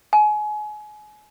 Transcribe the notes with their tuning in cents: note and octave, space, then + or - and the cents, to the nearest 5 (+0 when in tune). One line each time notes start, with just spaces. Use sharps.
G#5 +30